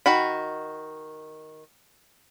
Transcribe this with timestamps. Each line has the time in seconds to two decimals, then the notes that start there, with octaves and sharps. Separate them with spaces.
0.06 D#3 F#4 B5